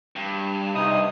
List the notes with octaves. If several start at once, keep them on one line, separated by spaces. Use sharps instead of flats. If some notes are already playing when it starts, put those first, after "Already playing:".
G2
C3 D#4 D#6